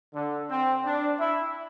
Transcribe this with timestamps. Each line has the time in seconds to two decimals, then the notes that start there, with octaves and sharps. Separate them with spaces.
0.15 D3
0.50 C4
0.84 D4
1.19 E4